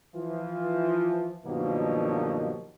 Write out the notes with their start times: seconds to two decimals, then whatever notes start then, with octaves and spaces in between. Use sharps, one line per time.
0.15 E3 F3 F4
1.46 G2 B2 D#3 F3 F#3 A#3